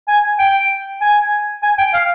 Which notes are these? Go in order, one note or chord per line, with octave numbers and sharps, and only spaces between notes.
G#5
G5
G#5
G#5
G5
F5